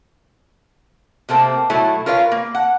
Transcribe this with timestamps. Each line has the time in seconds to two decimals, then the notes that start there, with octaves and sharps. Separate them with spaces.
1.29 C3 A3 A#3 C4
1.70 B2 F#3 A3 E4
2.06 F4 A#4 B4 C#5 F5
2.32 A#3
2.55 F#5